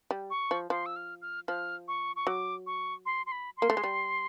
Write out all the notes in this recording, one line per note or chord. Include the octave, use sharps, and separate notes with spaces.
G3
C#6
F3
F3 C6
E6
F6
F6
F3 F6
C#6
C#6
F#3 D6
C#6
C6
C6
B5
C6
A#3
A3
G#3
G3